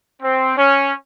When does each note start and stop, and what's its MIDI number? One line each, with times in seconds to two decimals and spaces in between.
0.23 0.57 60
0.57 0.93 61